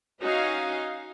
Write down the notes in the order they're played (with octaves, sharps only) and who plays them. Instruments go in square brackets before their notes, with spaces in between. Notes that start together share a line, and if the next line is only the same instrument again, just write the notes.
[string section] C#4 D#4 F#4 F5 G#5